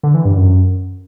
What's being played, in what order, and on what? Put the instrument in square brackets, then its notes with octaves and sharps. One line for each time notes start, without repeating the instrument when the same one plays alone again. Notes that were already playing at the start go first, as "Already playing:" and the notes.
[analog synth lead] D3
E3
G2
F#2